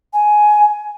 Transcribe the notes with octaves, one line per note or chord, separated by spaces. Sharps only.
G#5